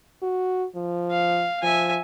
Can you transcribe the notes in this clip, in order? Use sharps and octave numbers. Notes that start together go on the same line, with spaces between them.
F#4
F3
F5
F3 E5 G#5